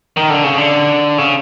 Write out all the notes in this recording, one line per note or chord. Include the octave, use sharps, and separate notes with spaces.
D#3
D3
C#3
D3
C#3